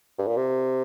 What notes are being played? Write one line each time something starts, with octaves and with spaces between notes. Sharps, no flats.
G2
A#2
C3